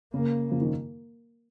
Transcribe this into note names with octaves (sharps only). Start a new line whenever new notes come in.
C#3 A#3
C#3 F3
D#3